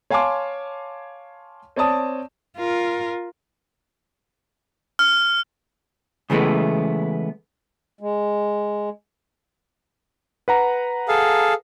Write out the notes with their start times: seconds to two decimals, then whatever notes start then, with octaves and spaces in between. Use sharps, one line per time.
0.10 C#5 F5 G#5 A5 C6 D6
1.76 C4 C#5 D5 A5 D#6
2.57 F4 A#4
4.99 F6
6.30 C#3 E3 G#3 A3 B3
8.01 G#3
10.48 B4 F#5 A#5
11.08 G#4 A4 F5